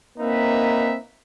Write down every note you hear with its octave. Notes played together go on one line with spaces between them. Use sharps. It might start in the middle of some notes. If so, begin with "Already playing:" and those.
A#3 C4 D#4 B4 E5